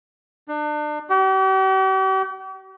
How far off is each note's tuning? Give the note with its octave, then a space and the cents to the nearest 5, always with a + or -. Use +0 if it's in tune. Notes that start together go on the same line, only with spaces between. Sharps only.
D4 +35
G4 -45